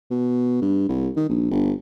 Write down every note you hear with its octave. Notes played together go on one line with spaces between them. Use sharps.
B2
G2
C2
D#3
A#1
G1